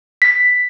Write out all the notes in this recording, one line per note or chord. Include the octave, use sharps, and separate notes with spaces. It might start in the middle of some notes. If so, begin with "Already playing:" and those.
B6